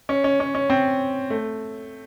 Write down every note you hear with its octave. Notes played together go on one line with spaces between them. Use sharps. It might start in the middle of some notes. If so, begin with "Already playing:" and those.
C#4
C#4
C#4
C#4
C4
A3